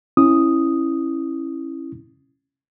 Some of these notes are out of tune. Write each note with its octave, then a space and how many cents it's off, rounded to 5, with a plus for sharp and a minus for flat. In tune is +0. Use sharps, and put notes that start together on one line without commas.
C#4 -25 E4 +0 D#6 +0